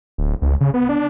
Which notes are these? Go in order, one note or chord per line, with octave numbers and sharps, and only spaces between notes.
D1
C#2
C#3
B3
D4